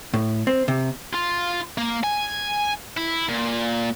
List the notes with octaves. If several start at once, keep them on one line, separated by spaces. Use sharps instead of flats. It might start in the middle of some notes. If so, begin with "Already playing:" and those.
A2
C4
C3
F4
A#3
G#5
E4
A#2